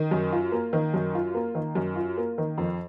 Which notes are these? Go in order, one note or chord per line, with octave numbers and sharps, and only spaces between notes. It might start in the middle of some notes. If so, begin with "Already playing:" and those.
Already playing: D#3
F#2
F4
A#3
D#3
F#2
F4
A#3
D#3
F#2
F4
A#3
D#3
F2